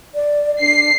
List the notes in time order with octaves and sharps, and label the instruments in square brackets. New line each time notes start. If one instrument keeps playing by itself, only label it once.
[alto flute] D5
[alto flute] D4 [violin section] C7